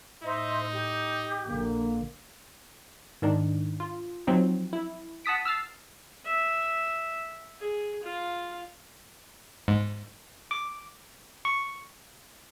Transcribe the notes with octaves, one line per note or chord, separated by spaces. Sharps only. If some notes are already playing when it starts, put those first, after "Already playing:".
A2 D#4 C5 D#5 E5
G4
A#1 D3 A#3
G#2 D#3 D4 D#4
F4
F3 F#3 C4 D#4
E4
F#5 A5 D#6 B6 D7
E6 F6 A6 C7
E5
G#4
F4
G#2
D6
C#6